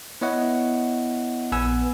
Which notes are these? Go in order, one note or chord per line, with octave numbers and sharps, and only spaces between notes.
B3 E4 C#5 D#5 F#5
A#1 B3 B4 G#5 E6